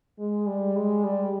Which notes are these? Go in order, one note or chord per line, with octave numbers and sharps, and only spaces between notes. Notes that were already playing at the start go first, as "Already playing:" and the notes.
G#3
G3
G#3
G3